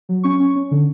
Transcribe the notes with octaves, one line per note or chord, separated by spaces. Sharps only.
F#3
C#4 C#6
C#4
C#4
D3